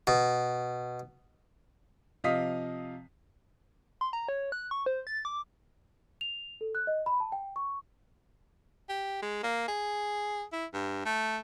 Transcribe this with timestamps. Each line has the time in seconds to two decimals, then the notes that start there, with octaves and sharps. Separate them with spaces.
0.07 B2
2.24 C3 F3 D#5 F5 D#6 B6
4.01 C6
4.13 A#5
4.28 C#5
4.52 F#6
4.71 C#6
4.86 C5
5.07 A6
5.25 D6
6.21 F7
6.61 A4
6.75 F#6
6.87 D#5
7.06 B5
7.20 A5
7.32 G5
7.56 C#6
8.89 G4
9.23 G#3
9.43 A#3
9.68 G#4
10.52 E4
10.73 G2
11.05 A3